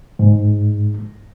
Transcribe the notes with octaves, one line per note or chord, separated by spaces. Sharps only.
G#2